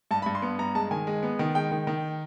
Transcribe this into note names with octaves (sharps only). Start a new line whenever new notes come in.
G2 A5
G2 B5
C6
B3
G2 A#5
G#3 A5
D#3 G#5
G#3
B3
D#3
G#3 G5
D#3
D#3